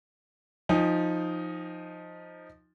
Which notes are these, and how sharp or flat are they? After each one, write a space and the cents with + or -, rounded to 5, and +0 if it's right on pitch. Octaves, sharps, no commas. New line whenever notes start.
F3 +5 D#4 +0 G#5 -40